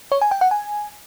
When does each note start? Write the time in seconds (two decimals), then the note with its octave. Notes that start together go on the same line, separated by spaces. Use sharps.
0.12 C#5
0.21 G#5
0.31 G5
0.41 F#5
0.51 G#5